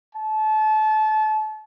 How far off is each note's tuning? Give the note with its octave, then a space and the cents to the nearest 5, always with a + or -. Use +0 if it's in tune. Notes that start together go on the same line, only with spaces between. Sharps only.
A5 -30